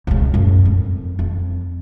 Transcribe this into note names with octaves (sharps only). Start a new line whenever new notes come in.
C#2 C#3
F#2 A2
F2
F2